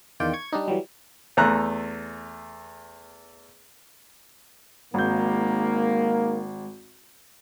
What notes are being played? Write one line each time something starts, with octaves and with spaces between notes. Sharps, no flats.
E2 D#3 F4 D5 G5
C#6 G#6
G3 D4 D#4
E3 F#3 G3
E2 A3 A#5 F#6
G#1 G#2 A#3 G6